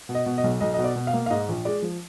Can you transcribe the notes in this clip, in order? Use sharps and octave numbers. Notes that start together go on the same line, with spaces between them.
B2
D#5
B2
D#5
B1
B1 D#5
B2 D#5
D5
B2
F5
A#3
F5
G#2 D#5
A#1
G#3 D5
F3